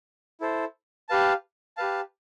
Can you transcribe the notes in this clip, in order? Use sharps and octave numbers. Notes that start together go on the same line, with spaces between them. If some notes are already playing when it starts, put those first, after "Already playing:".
E4 A4 C5
G4 B4 F5 A5
G4 B4 F5 A5